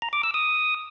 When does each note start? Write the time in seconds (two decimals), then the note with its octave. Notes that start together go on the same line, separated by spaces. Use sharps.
0.02 A#5
0.13 D6
0.24 E6
0.34 D#6